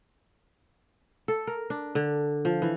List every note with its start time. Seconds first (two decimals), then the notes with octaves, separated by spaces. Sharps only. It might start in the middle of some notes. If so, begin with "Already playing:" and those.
1.28 A4
1.47 A#4
1.70 D4
1.95 D3
2.45 F3
2.62 E3